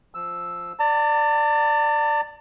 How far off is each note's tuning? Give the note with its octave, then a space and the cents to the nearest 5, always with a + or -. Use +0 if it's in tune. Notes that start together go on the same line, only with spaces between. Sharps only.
F3 +0 E6 +0
D5 +0 A5 +45